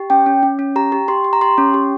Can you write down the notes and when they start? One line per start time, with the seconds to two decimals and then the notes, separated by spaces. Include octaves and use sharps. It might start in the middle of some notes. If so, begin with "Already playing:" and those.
Already playing: G4
0.10 C#4 G5
0.26 C#4
0.43 C#4
0.59 C#4
0.76 G4 A#5
0.92 G4
1.08 G4 C6
1.24 G4
1.33 A#5
1.41 G4 C6
1.58 C#4
1.74 G4